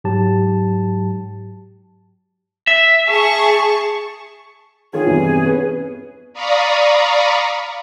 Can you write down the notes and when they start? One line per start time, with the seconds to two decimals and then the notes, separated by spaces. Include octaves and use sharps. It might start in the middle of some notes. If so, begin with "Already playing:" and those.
0.04 G#2 F#3 G4 A5
2.67 E5
3.11 G#4 A5 C#6
4.93 D#3 F4 G#4 C#5
5.06 E2 G2 C3
5.44 B3 C#4
6.34 D5 F5 A#5 B5 C#6 D#6